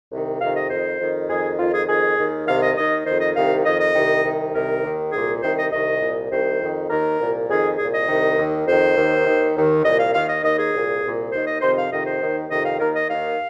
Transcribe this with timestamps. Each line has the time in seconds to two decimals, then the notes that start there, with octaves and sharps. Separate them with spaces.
0.11 C2 C3 D#3
0.40 F2 C3 D#3 F5
0.55 D#5
0.70 F2 D#3 C5
1.00 F2 D#3
1.29 F2 D#3 G#4
1.58 F2 D#3 F4
1.73 G#4
1.88 F2 D#3 G#4
2.18 D#2 D#3
2.47 C2 C3 D#3 F5
2.62 D#5
2.76 D#2 D#3 D#5
3.06 F2 D#3 C5
3.21 D#5
3.35 C2 C3 D#3 F5
3.65 F2 D#3 D#5
3.79 D#5
3.95 C2 C3 D#3
4.24 C2 C3 D#3
4.53 C2 C3 D#3 A#4
4.83 D#2 D#3
5.12 C2 A#2 G#4
5.42 C2 C3 D#3 C5
5.57 D#5
5.71 C2 C3 D#3 D#5
6.01 C2 A#2
6.31 C2 C3 D#3 C5
6.60 F2 D#3
6.89 D#2 D#3 A#4
7.19 C2 A#2
7.49 F2 D#3 G#4
7.78 C2 A#2 G#4
7.93 D#5
8.08 C2 C3 D#3
8.37 D#2 D#3
8.67 F2 D#3 C5
8.96 D#2 D#3
9.26 D#2 D#3
9.55 D#2 D#3
9.84 C2 A#2 D#5
9.99 F5
10.14 D#2 D#3 F5
10.29 D#5
10.44 D#2 D#3 D#5
10.58 G#4
10.73 C2 A#2
11.03 C2 A#2
11.32 D#2 D#3 C5
11.47 D#5
11.61 F2 C3 D#3 C5
11.77 F5
11.91 F2 C3 D#3 D#5
12.06 C5
12.21 D#2 D#3
12.50 F2 C3 D#3 D#5
12.65 F5
12.80 D#2 D#3 A#4
12.95 D#5
13.09 D#2 D#3 F5